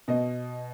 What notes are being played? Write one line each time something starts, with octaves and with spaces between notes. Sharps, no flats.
B2 D#5